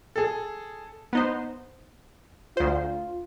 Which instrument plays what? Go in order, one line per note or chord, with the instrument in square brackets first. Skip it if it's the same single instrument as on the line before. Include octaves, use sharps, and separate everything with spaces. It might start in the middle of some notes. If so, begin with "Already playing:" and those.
[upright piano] G#4 A4
[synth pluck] B3 D#4 C5
[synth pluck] D2 C5 [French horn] F4